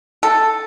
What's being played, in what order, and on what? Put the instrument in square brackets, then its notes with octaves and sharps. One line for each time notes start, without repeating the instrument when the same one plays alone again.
[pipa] A4